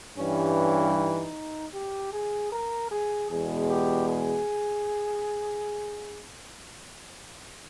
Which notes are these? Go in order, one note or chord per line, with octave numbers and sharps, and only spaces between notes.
G2 E3 G3 C#4
C#4
D#4
G4
G#4
A#4
G#4
E2 B2 G#3 G#4
G4
G#4